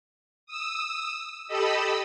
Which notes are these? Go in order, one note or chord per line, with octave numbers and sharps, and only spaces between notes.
D#6 E6
G4 A4 D#5 B5 D#6 E6